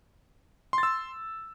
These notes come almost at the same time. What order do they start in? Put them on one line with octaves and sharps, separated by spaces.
C6 A6 E6